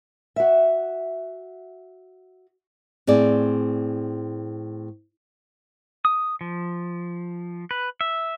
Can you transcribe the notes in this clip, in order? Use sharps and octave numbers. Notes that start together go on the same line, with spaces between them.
F#4 E5
A2 C4 G#4 D5
D#6
F3
B4
E5